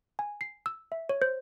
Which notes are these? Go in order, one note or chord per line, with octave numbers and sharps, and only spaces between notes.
G#5
C7
E6
E5
C#5
C5